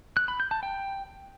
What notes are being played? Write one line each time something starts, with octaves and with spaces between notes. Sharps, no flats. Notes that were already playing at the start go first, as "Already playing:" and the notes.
F#6
B5
G6
A5
G5